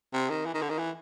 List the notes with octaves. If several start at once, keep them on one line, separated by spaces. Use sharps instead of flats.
C3
D#3
E3
D#3
D3
D#3
E3